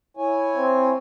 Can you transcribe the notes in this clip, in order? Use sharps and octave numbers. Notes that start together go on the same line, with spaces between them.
E4 C#5 G#5
C4